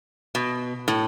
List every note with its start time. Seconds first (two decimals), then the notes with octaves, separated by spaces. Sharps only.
0.35 B2
0.88 A2